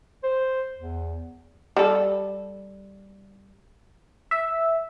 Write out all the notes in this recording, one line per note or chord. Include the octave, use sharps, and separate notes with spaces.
C5
E2
G3 A4
E5